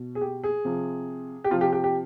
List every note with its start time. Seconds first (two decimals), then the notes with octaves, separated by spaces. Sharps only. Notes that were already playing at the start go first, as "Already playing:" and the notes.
Already playing: B2
0.15 G#4
0.21 G4
0.44 G#4
0.65 C3 F3
1.44 G4
1.50 C3 F3 F4
1.61 G4
1.73 G4
1.84 G4